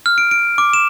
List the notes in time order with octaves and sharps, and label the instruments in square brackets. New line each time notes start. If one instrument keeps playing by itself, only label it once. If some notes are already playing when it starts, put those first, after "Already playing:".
[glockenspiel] F6
D7
D7
D6
E7